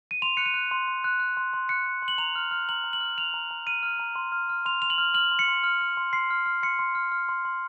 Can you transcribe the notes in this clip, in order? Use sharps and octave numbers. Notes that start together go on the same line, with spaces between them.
D#7
C6 F7
F#6 C#7
D#7
F#6
C6
C6
F#6
F#6
C6
C6
F#6 C#7
F#6
C6
F#7
A#5 F7
F6
F6
A#5 F#7
A#5
F#7
F6
F6 F7
A#5
A#5
F6 D#7
F6
A#5
C6
F6
F6
C6 F7
C6 F7
F#7
F6
F6 F#7
C6
C#7
C6
F6
F6
C6
C6 C7
F6
F6
C6 C#7
C6
F6
F6
C6
C6